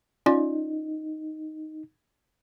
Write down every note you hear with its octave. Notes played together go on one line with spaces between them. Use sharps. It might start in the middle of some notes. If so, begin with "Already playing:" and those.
C#4 D#4 F4 D5